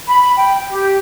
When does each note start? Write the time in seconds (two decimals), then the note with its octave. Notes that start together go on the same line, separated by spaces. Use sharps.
0.07 B5
0.37 G5
0.70 G4